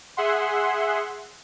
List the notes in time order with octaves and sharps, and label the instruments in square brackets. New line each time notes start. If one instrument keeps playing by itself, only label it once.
[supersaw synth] G#4 E5 F#5 C6